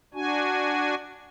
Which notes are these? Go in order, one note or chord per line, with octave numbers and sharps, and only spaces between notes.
D4 F#4 G#5